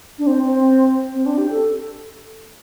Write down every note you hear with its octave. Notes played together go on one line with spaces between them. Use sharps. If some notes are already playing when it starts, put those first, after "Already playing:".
D4
C4
C4
C4
D4
G4
A4